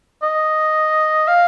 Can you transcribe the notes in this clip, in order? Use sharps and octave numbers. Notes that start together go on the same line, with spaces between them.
D#5
F5